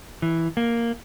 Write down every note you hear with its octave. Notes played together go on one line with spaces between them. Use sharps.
E3
A#3